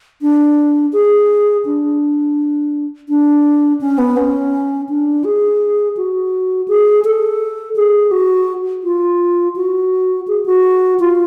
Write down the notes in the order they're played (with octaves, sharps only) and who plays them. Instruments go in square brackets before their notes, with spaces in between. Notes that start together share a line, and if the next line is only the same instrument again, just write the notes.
[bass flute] D4
G#4
D4
D4
C#4
B3
C#4
D4
G#4
F#4
G#4
A4
G#4
F#4
F4
F#4
G#4
F#4
F4